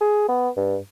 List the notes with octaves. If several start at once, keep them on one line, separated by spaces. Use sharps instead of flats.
G#4
B3
G2